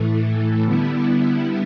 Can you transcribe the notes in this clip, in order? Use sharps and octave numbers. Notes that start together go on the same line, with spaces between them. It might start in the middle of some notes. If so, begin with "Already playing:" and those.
Already playing: A2 E3 A3
D3 G3 B3 E4